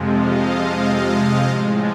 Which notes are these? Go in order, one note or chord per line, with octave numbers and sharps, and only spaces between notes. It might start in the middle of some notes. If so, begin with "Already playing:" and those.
Already playing: F2 C3 F3 G#3
D#5 F5
A2 F3 G#3